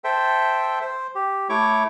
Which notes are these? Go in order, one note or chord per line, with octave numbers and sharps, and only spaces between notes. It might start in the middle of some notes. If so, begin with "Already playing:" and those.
A4 C5 E5 G5
C5
G4
A3 E4 C#5 C#6 D6